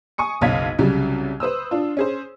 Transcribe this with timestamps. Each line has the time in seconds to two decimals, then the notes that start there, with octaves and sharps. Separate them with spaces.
0.18 G#5 C#6 D#6 C#7
0.41 F#1 B1 C#4 F5 G#6 B6
0.79 C2 C#3 F#3 G3
1.40 B4 C5 D#6 E6
1.71 D4 F4
1.97 C#4 G#4 C5